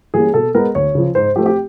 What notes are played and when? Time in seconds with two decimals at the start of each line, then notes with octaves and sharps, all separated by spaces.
0.14 E3 G3 A#3 C#4 G#4
0.34 B2 A4
0.55 G#3 B3 A#4
0.75 D2 C#5
0.95 C#3 F3
1.15 G#2 C5
1.36 F3 A3 C4 G4
1.46 G4